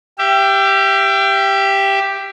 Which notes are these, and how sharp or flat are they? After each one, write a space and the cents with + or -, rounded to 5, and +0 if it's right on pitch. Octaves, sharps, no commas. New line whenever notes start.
G4 +0 E5 +35